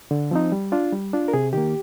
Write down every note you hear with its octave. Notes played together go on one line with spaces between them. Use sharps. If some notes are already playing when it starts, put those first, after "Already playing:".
D3
F3 C4 D#4
G3
D4 F4
G3
D4 F4
A#4
C3 G#4
D#3 A#3 G4